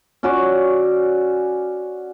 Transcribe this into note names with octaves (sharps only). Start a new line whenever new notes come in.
C#4 F#4 D5